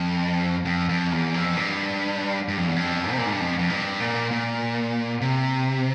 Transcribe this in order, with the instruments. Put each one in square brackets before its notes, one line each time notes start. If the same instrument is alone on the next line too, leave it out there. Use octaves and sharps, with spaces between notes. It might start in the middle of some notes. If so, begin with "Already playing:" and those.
Already playing: [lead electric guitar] F2
F2
F2
E2
F2
G2
G2
F2
E2
F2
C3
A#2
G#2
G2
F2
F2
G2
A#2
A#2
C3